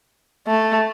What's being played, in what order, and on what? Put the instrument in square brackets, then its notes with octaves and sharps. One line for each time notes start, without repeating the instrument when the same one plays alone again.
[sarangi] A3